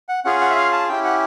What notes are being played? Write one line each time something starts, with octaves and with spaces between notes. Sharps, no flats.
F#5
C#4 F4 G#4 F#5
F#5
E5
F5
A5
C#4 E4 G4 G5
F#5